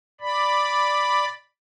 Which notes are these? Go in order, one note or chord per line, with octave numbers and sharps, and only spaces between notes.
D5 B5